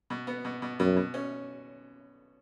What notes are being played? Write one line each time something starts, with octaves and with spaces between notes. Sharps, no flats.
B2
B3
B2
B2
F#2 B2
B2
C#4